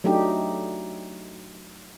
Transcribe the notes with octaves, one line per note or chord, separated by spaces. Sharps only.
F#3 A3 D4 D#4 G4